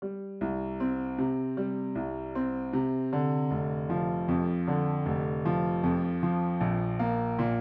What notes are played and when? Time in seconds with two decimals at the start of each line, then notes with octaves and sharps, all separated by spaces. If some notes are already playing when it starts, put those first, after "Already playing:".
0.02 G3
0.41 C2
0.80 C4
1.18 C3
1.57 G3
1.95 C2
2.35 C4
2.73 C3
3.13 D3
3.51 F1
3.90 F3
4.28 F2
4.68 D3
5.06 F1
5.45 F3
5.83 F2
6.23 F3
6.61 A#1
6.99 A#3
7.39 A#2